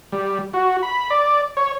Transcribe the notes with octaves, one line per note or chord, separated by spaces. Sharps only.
G3
F#4
B5
D5
C#5